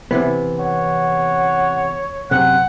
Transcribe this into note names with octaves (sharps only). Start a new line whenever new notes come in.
C3 E3 B3
C#5 F#5
F#2 C3 F#5